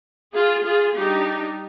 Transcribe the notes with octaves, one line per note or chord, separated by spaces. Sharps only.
F4 G#4
F4 G#4
G3 D4 D#4 G4